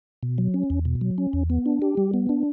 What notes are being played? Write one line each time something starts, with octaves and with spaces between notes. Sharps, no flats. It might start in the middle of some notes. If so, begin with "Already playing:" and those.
B2
F#3
C#4
E2
B2
F#3
C#4
E2
B3
D4
G4
G3
B3
D4